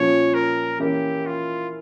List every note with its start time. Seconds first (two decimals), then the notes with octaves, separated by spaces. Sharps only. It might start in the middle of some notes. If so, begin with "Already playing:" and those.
Already playing: A#2 F3 C#4 C#5
0.34 A#4
0.80 E3 A#3 C#4 E4 G4
1.26 F4